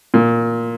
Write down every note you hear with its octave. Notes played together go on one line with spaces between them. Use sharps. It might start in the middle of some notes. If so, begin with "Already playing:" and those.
A#2